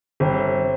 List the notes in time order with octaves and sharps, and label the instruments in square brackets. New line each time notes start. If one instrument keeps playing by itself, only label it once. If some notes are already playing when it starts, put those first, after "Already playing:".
[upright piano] G1 [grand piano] C4